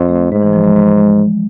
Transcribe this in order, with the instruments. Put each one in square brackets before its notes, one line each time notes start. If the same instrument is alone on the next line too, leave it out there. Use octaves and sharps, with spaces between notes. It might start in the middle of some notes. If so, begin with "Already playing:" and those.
Already playing: [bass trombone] F2
[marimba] A3
[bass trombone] G#2 [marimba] G#3
[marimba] E3
F3
G#3
G#3
G#3